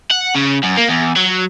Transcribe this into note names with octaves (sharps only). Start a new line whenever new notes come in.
F#5
C#3
F#2
A#3
E2
F#3